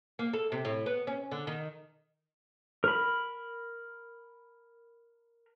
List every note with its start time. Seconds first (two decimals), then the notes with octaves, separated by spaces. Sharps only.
0.19 A#3
0.33 A4
0.52 C3
0.65 A2
0.86 B3
1.07 C#4
1.31 D3
1.47 D#3
2.84 A#4 B5